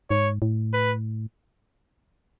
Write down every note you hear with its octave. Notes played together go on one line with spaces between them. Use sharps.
G#2 C#5
A2
B4